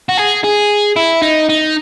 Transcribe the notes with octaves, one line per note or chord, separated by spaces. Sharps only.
F#4
G#4
G#4
E4
D#4
D#4